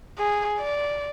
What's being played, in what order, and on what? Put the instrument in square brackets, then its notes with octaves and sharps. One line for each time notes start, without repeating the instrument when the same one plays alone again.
[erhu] G#4
D5